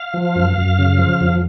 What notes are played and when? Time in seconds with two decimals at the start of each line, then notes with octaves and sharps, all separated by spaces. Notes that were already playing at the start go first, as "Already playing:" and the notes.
Already playing: F5
0.14 F3
0.36 F#2
0.57 F#2
0.79 C#3
0.99 F3
1.21 F2